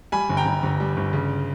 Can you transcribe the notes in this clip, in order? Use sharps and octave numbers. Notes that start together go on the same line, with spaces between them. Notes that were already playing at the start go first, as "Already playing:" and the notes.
G3 G#5 B5
G1
G5 A#5
G1
G1
G3
G1
C#3